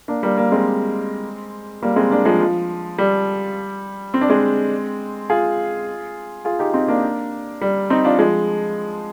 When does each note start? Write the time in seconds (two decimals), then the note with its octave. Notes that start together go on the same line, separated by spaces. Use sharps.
0.08 A#3 D4
0.23 G3 A#3
0.37 G3 A#3
0.52 G#3 C4
1.82 G3 A#3
1.96 G#3 C4
2.11 A#3 D4
2.25 F3 G#3
2.40 F3
2.98 G3
4.14 C4
4.21 D4
4.30 G#3 C4
5.30 F4 G#4
6.45 F4 G#4
6.59 D#4 G4
6.74 C4 D#4
6.88 A#3 D4
7.61 G3
7.90 C4 D#4
8.05 D4 F4
8.19 F3 G#3